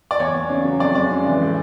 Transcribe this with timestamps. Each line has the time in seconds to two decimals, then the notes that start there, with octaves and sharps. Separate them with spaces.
0.11 D5
0.20 E2 C#5
0.34 E2
0.50 C#3
0.65 F#3
0.80 F2 D5
0.95 G#3 D5
1.10 C#3
1.26 E3
1.42 A2